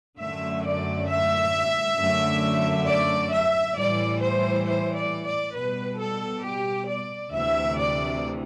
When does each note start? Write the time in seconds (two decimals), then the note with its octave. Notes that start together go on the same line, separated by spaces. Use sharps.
0.19 F#2 D3 A3 E5
0.65 D5
1.08 E5
1.98 F#2 D3 A3
2.87 D5
3.31 E5
3.76 A2 E3 G3 D5
4.21 C5
4.65 C5
4.95 D5
5.24 D5
5.54 B2 G3 B4
5.98 A4
6.43 G4
6.88 D5
7.32 D2 C3 E3 E5
7.77 D5